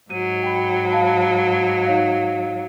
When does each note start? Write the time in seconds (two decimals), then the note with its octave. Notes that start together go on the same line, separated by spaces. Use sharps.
0.10 G#2 F#3 D#7
0.43 G5 B5
0.91 F5 A5 B5
1.86 D#4 C#5 F5